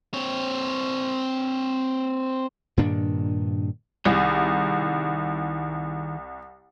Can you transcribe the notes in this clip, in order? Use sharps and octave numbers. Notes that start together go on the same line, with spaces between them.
C4 C#5
G2 A#2 D#3 D4
C2 D#3 E4 G#4